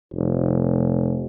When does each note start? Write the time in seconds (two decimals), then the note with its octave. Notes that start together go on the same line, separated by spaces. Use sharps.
0.14 F1